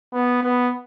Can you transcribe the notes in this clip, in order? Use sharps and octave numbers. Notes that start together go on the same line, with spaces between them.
B3
B3